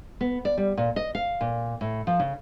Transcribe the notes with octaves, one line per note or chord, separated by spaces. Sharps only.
B3
D5
G3
A#2
D#5
F5
A#2
A2
F3
C#3